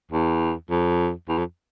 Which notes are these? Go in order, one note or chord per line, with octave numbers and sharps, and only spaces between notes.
E2
F2
E2
F2